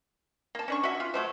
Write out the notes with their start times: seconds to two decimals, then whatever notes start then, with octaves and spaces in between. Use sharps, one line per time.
0.55 A#3 A5
0.68 C#4 D4 C#6
0.83 F#4 E5
1.00 F4
1.14 F#3 A3 C5